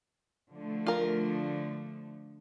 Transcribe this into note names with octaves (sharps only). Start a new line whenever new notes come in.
D3 F3 A3
F4 A#4